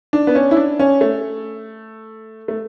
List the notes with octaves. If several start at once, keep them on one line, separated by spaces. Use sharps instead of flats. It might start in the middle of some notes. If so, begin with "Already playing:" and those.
D4
B3
C#4
E4
D4
C#4
A3
A3